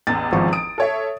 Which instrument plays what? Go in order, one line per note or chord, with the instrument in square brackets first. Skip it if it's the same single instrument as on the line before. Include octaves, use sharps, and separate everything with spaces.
[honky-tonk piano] A1 E2 [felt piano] A6
[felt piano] G#1 F3 C#6
[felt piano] D#6 [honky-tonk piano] D7
[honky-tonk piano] A4 C#5 E5